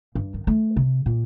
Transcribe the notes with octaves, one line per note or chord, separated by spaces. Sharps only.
G2
D#3
A3
C3
A#2